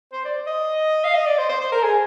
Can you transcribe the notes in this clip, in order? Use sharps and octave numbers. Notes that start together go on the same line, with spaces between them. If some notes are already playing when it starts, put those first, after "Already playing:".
C5
D5
D#5
F5
D#5
D5
C5
C5
C5
A#4
G#4